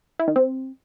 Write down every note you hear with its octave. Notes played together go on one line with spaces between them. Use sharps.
E4
D#3
C4